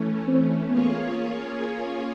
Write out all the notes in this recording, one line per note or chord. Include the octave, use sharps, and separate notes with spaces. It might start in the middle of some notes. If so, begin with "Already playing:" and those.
Already playing: E3 A3 C#4
C4
A#3 B3 C#4 F4 G#4 C#5